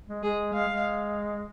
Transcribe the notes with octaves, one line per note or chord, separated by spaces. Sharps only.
G#3
G#3 G#4
G#3 F5
G#3